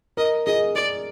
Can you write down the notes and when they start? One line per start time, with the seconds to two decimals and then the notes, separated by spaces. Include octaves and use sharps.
0.17 A#4 D#5
0.47 G#4 D#5
0.75 G#4 D5